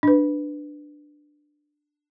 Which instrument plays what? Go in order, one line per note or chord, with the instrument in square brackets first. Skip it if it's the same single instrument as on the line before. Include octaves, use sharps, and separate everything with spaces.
[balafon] D4 B4